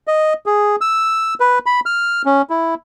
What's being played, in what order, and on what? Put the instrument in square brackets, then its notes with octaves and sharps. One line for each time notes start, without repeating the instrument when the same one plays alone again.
[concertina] D#5
G#4
E6
B4
B5
F6
C#4
E4